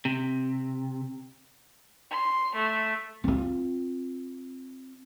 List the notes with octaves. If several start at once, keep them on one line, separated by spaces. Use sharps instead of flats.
C3
C6
A3
C4 F4